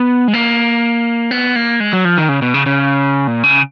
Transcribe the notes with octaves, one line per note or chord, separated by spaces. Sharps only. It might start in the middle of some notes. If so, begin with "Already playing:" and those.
Already playing: B3
G#3
A#3
B3
A#3
G#3
F#3
F3
D#3
C#3
B2
C#3
C#3
A#2
C#3